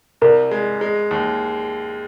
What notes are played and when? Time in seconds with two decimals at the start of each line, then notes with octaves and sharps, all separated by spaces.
0.22 C2 A#4
0.51 G#3
0.81 G#3
1.11 D#2